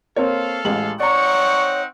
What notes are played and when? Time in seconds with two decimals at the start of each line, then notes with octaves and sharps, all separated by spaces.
0.16 A#3 C4 A4 C#5 F5
0.65 A1 G#3 F#7
1.00 C4 D#4 C#5 D5 F#5 A#5 C#6